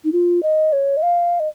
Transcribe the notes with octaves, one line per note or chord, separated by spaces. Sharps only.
D#4
F4
D#5
C#5
D#5
F5
D#5